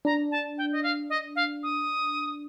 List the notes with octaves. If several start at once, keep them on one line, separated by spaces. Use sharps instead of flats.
D4 A#5
A5
G5
D#5
F5
D#5
F5
D#6